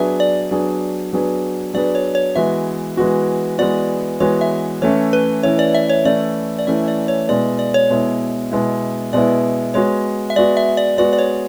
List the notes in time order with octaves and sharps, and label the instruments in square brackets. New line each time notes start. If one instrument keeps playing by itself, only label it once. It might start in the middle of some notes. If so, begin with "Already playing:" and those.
Already playing: [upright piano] F#3 B3 D4 G#4 B4 [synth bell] E5
[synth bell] D5
[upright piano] F#3 B3 D4 G#4 B4
F#3 B3 D4 G#4 B4
[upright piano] F#3 B3 D4 G#4 B4 [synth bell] D5
[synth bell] C#5
C#5
[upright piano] E3 G#3 B3 F#4 [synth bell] E5
[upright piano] E3 G#3 B3 F#4
[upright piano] E3 G#3 B3 F#4 [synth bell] D5
[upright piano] E3 G#3 B3 F#4 [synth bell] C#5
[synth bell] E5
[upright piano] E3 A3 C#4 E4 [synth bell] C#5
[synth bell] B4
[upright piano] E3 A3 C#4 E4 [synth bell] C#5
[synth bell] D5
E5
C#5
[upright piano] E3 A3 C#4 E4 [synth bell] D5
[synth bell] D5
[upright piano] E3 A3 C#4 E4 [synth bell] E5
[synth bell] D5
C#5
[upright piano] B2 G#3 B3 E4 [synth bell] D5
[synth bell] D5
C#5
[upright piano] B2 G#3 B3 E4
B2 G#3 B3 E4
[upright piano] B2 G#3 B3 E4 [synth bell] D5
[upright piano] G#3 B3 F#4 [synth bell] C#5
[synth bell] E5
[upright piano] G#3 B3 F#4 [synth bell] D5
[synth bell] E5
D5
[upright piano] G#3 B3 F#4 [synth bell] D5
[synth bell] D5
C#5